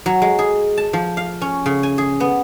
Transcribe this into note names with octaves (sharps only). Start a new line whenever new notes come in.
F#3
G#3
G#4
A5
F3
F5
C#4
C#3
G#5
G#4
B3